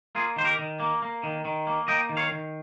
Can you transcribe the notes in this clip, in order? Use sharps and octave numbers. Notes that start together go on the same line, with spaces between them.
A#3 F4 G#4
D#3 C5
G4 A#4
D#3
A#3
A#3
D#3
D#3
A#3
A#3 D#5 G5
D#3
C#5 F5
D#3